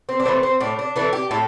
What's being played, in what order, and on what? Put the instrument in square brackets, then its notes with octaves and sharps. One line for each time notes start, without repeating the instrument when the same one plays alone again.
[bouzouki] C4
D4
E3 A3 C4
C4
A2 D4
D4
E3 A3 D4
G4
A2 A4